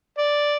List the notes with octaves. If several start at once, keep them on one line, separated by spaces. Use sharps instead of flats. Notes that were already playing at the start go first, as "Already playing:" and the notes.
D5